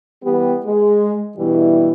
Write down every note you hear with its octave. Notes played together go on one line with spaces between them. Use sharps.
E3 G3 B3 G4
G#3
G2 B2 E3 G3 E4